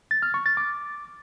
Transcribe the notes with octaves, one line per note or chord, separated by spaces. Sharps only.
A6
F6
C#6
A6
D6